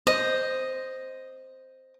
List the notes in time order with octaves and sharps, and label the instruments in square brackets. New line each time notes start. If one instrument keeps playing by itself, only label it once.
[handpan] C5 [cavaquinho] D#5